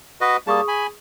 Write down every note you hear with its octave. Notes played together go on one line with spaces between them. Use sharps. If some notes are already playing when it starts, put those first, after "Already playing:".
F#4 B4 D#5
G3 A#3 G#4 A5 C#6 D#6
G#5 B5